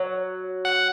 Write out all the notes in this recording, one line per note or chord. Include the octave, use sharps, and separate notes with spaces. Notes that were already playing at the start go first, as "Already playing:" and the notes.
Already playing: F#3
F#5